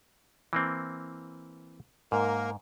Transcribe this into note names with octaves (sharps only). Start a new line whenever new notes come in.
E3 A#3 C4
G#2 A#3 A#4